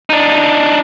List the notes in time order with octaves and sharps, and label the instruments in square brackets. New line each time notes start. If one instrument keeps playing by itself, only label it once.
[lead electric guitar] D4 D#4